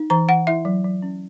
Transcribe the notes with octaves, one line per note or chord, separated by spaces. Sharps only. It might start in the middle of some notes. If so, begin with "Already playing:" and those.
Already playing: D#4
E3 A#5
E3 F#5
E4 E5
F#3
F#3
C#4